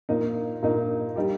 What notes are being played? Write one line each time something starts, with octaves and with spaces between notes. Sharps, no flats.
A#2 A#3 D#4
A#2 A#3 D#4
G3 D#4 G4